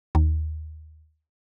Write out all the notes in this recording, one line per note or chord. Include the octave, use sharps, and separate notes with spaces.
D#2